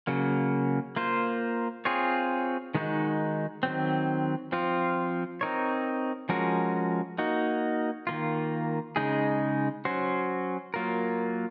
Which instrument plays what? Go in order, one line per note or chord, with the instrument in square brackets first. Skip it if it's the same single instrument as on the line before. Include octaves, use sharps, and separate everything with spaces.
[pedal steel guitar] C#3 F#3 A#3
A#3 F4 C5
C4 F4 G#4 C#5
D#3 G#3 D#4 F#4
D#3 F#3 C4
F3 C4 F4
C4 D#4 A#4 C#5
F3 G#3 C#4 F#4 A#4
A#3 D#4 F#4
D#3 A#3 F4
C#3 G#3 D#4 G#4
F#3 C#4 F#4 C5
F#3 A#3 F4 A#4